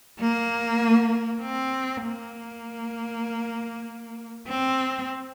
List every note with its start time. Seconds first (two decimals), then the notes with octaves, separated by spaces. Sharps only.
0.19 A#3
1.42 C4
2.03 A#3
4.48 C4